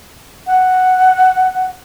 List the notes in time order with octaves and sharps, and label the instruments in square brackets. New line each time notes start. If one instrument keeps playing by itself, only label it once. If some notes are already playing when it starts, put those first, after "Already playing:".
[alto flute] F#5